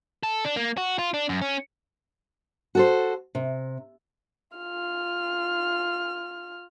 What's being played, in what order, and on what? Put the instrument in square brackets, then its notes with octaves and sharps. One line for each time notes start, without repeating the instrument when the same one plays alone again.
[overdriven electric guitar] A4
D4
A#3
F#4
F4
D4
F#2
C#4
[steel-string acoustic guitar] F#4 A4 C5
C3
[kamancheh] F4 F6